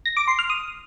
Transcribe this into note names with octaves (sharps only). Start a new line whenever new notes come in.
A#6
D6
C6
F6
D#6